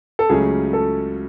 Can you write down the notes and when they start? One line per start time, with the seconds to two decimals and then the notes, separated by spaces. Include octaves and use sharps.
0.19 A4
0.29 C#2 C#3 F#3 A3 C#4 G#4
0.73 A4